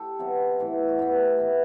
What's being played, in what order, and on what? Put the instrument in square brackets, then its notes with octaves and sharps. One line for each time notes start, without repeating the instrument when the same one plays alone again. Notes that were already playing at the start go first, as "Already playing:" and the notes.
Already playing: [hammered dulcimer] G4 A4
C3 F#3 B3
A2 E3 B3
F#4
A2 E3 B3 G4
A2 E3 B3